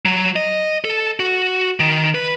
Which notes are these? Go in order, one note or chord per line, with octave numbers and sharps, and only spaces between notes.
F#3
D#5
A4
F#4
D#3
B4